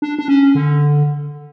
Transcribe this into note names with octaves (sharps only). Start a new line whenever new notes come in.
D4
D4
C#4
D3